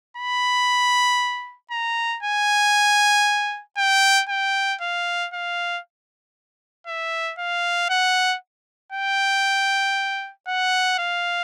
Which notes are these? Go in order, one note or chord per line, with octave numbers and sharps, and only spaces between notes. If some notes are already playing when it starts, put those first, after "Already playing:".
B5
A#5
G#5
G5
G5
F5
F5
E5
F5
F#5
G5
F#5
F5